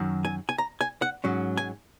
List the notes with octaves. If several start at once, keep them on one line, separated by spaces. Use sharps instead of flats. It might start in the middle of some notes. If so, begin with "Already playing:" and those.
Already playing: F#2 D#3 F#3
G#5
G#5
A#5
G#5
F#5
G#2 F#3 C#4
G#5